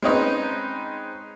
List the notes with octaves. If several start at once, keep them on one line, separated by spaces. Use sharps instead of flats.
G#3 C4 C#4 D#4 B4